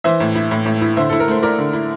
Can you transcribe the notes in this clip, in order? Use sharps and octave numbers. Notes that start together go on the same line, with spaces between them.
E3 C5 E5
A2
E4
A2
A2
E4
D3 C5 E5
E4 A4
A#4
A3 C5
E4 A#4 D5
D3
E4